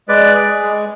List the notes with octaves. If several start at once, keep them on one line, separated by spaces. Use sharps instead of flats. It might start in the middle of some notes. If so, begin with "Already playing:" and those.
G#3 B4 D5
G#4
G#3